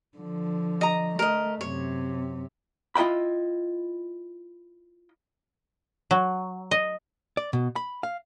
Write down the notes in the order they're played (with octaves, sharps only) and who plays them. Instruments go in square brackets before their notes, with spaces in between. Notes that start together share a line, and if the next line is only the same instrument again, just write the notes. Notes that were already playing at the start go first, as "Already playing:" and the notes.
[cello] D3 F3
[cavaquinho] D#5 A#5
[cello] A3 [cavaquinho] A#4 D#5
[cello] F#2 C3 [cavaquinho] C#5
[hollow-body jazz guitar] E4 F4 D#5 G5 B5
[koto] F#3
D#5
[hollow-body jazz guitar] D5
B2
B5
F5